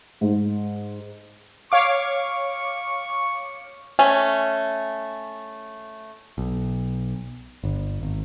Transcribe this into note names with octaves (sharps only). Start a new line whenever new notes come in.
G#2
C#5 F5 C#6 D6
A3 C#4 G#5
B1
G1
G#1